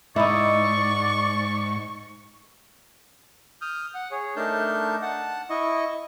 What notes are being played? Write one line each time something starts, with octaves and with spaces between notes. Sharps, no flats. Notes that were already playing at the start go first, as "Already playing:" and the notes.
G#2 D#4 E4 D5 C#6
D#6 F6 G6
F#5
G#4 C#5
A3 D4 D#4 A#4 A5 G6
F#5 A5
E4 D#5 C#6